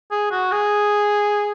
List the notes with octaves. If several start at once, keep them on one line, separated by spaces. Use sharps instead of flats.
G#4
F#4
G#4